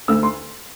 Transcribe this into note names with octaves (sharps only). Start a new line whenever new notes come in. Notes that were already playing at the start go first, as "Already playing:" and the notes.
D2 E6
C6